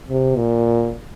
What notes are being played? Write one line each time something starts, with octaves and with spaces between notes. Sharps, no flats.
C3
A#2